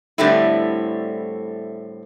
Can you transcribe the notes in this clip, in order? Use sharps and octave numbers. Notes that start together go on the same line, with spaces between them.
A2 D3 G3 A3 C4 E4